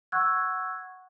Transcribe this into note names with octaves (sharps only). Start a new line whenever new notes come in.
F#5 C#6 E6 F#6 G#6